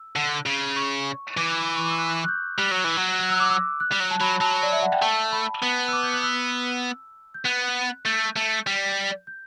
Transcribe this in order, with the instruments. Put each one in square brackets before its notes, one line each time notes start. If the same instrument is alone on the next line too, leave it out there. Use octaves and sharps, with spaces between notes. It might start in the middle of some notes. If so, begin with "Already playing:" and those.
Already playing: [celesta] E6
[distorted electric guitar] D3
C#3
[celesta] C#6
[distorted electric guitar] E3 [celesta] D6
[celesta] C#6
D6
E6
F#6
F#6
G6
[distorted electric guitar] G3 [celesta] F#6
[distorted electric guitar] F#3
E3
F#3
[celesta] F#6
E6
D6
E6
F#6
[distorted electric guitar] G3
F#3
[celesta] A5
[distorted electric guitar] F#3 [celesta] B5
[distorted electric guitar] F#3 [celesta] A5
[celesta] D5
E5
F#5
G5
[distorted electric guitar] A3 [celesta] A5
[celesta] B5
[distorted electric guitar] B3
[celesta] E6
D6
G6
F#6
E6
G6
[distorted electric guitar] B3 [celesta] F#6
[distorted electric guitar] A3 [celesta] G6
[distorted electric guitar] A3
G3
[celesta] G6